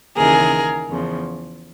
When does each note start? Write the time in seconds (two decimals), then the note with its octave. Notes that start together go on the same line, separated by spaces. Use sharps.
0.17 D#2 C#3 E3 G#4 A#4
0.90 E2 C#3 F3